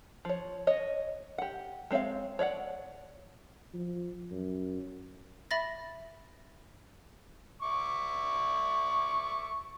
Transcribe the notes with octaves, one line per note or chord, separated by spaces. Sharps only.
F3 C#5
C#5 D#5
G4 F#5
G#3 C4 C#5 E5 F5
C#5 D5 E5 F#5
F3
F#2
E5 B5 A6 A#6
E5 C#6 D6